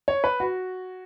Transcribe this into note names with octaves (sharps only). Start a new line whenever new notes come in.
C#5
B4
F#4